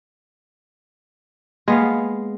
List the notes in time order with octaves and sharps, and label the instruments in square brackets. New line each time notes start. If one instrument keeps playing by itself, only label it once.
[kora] G#3 B3 F5 [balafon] A#3